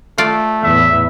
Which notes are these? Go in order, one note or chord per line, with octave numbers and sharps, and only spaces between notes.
A3 F4 D5
E2 A2 E3 E5